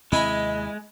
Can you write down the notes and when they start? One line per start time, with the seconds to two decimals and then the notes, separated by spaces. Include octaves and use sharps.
0.12 D#2 C3 G#3 C4 E4 D#5 G#5 B5